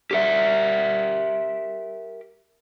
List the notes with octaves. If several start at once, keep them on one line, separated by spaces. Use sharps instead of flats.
G4 A#4 E5